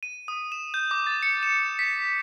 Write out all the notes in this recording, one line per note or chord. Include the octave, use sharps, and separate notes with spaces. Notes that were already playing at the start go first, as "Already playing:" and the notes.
D#7
D#6
E7
G6
D6
A6
C#7
E7
B6